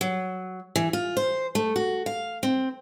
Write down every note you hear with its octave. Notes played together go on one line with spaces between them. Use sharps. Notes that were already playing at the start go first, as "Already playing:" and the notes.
F#3
E3
F4
C5
A3
F#4
F5
C4